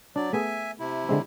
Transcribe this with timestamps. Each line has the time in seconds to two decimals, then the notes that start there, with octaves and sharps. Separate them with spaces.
0.16 F#3 D4 D5
0.33 A3 B3 G#4 E5 G#5
0.79 C3 E4
1.09 D3 G#3 C4